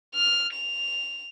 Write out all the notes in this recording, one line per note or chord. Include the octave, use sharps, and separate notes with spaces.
F6
F7